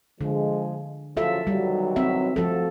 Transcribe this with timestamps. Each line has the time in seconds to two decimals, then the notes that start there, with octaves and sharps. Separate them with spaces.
0.21 D3 F3 G#3
1.17 C#3 F3 F#3 F4 A4 E5
1.47 B1 D#3 F#3 G3
1.96 C4 E5
2.36 F3 A3 C4 F#4 A4